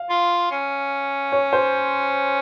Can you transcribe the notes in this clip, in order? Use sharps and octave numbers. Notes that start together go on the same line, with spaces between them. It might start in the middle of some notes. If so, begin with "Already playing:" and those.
Already playing: F5
F4
C#4
C#5
C5